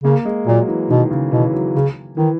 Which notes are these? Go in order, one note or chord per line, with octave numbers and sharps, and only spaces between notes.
C#3 A#3
G#3
A#2 F#3
E3
B2 D#3
C#3
B2 E3
F#3
C#3
D#3 E3